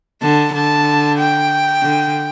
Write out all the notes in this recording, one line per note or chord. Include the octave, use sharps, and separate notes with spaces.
D3 A5
D3 A5
G5
D3